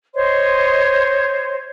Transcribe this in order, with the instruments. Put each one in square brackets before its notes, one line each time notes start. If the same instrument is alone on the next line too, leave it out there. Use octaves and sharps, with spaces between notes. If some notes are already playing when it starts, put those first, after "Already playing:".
[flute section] C5 C#5 D#5 C6